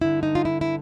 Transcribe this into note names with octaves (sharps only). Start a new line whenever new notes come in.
G2 D3 E4
D#4
F4
E4
E4